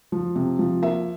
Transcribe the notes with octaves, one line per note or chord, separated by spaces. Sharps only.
F3
C3
F3
A#3 E5